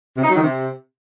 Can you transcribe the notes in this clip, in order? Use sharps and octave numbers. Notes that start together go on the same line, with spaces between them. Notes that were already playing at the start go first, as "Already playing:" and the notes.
C3
D#4
F#3
D#3
C3